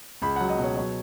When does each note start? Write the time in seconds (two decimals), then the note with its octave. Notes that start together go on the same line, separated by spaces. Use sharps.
0.22 C#2 B5
0.36 F#3 F#5
0.49 D#5
0.58 B2
0.64 C#5
0.77 F#3 C#5